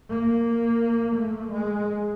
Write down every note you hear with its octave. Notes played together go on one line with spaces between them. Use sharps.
A#3
A3
G#3